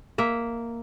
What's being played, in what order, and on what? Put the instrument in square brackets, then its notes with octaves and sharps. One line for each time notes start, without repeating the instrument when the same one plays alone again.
[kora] A#3 E5